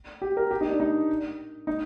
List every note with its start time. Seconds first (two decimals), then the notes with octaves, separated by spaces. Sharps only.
0.22 G4
0.37 A#4
0.51 G4
0.61 D#4
0.70 D4
0.80 D#4
1.67 D#4